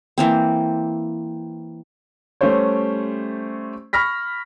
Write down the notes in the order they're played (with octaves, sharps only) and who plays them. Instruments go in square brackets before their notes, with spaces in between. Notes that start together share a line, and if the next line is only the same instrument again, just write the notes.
[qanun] E3 A#3 C4
[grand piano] G3 A3 C#4 G4 C5 C#5
B5 C#6 F6 A#6 B6